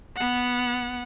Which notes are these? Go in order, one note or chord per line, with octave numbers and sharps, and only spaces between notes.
B3 F#5